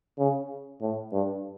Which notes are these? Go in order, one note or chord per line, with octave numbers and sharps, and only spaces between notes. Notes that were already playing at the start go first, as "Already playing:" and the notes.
C#3
A2
G2